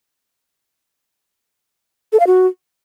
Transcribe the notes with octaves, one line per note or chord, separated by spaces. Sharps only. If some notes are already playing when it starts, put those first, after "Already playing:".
A4
F5
F#4